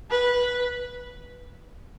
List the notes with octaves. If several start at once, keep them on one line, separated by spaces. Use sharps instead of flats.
B4